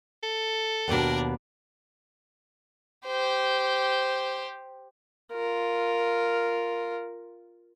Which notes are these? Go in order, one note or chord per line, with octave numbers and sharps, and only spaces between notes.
A4
D#2 B2 D4 A#4 D5
G4 C5
F4 A#4